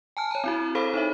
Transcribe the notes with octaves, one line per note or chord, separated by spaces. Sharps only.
G#5 A5 F6
C#5 A#5
C4 E4 F#4
G#4 A4 C5 F5 B5
D#4 C#5 E5